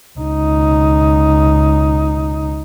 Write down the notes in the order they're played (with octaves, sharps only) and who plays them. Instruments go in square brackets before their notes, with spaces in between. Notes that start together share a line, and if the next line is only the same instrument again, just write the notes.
[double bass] C#2 D#4